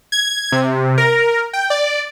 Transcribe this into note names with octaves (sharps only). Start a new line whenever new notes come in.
G#6
C3
A#4
G5
D5